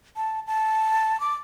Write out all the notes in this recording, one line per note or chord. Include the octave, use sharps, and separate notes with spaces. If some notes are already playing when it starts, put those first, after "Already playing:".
A5
A5
D6